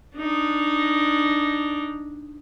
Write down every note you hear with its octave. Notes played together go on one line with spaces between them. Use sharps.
D4 D#4